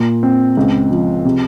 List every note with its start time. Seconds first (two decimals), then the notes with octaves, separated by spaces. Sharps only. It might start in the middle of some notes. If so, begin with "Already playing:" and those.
Already playing: A#2
0.23 C4
0.57 C#2
0.91 F3
1.25 C3